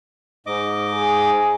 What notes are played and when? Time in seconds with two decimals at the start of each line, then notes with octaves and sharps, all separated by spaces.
0.47 G#2 D#5 D6
0.94 G#4